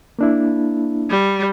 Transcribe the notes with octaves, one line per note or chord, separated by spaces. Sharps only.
A#3 D4 E4
G3